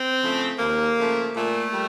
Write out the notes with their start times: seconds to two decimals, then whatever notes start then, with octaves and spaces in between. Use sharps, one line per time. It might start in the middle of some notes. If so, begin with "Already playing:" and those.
Already playing: C4
0.21 C#3 F3 A3
0.59 D#2 A#3
0.97 C#3 F3 A3
1.35 A#2 A3
1.73 G3